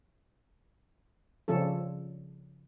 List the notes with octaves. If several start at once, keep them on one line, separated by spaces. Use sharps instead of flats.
C#3 F3 G3 C#4 A4